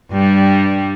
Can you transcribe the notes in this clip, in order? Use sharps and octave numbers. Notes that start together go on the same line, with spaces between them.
G2 G3